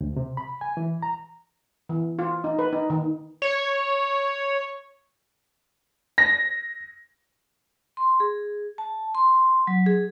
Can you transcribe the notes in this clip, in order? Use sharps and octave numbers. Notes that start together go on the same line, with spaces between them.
D2
C3
B5
G#5
E3
A#5
E3
F4
D#4
B4
D#4
D#3
C#5
A#6
C6
G#4
A5
C6
F#3
G#4